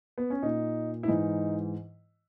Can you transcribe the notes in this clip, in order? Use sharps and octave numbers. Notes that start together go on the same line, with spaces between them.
B3
C#4
A#2 D#4
E4
G#2 E3 D#4